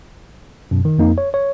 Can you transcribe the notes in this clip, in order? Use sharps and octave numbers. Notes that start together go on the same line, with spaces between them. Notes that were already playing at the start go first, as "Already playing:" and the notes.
F#2 B2
D#3
F2 A#3 D#4
C#5
C#5